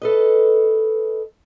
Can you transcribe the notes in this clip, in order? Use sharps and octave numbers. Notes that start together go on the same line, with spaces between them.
A4 B4 D#5